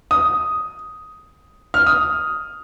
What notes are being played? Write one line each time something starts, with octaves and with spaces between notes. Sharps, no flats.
D#6
F6
D#6